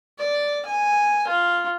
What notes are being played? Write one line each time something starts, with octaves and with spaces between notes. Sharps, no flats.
D5
G#5
F4